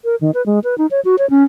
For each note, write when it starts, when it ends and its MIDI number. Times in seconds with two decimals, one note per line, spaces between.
0.05 0.16 70
0.21 0.31 51
0.34 0.44 71
0.46 0.59 56
0.64 0.78 71
0.78 0.86 63
0.91 1.00 73
1.05 1.16 66
1.18 1.29 73
1.30 1.44 61